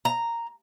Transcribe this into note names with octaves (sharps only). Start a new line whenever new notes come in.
A#5